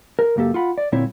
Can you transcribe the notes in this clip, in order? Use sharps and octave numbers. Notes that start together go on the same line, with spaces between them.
A#4
C#2 F#2 A#3 G4 A4
F4 F#5 B5
D5
D2 A#2 G3 C4 E4 C#5